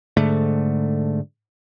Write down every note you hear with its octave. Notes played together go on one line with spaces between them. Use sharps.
G#2 D3 A3